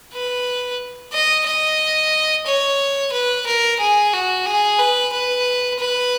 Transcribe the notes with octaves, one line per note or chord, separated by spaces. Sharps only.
B4
D#5
D#5
C#5
B4
A#4
G#4
F#4
G#4
B4
B4
B4